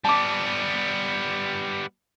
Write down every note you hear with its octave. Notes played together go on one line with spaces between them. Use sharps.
G3 B3 A5 D6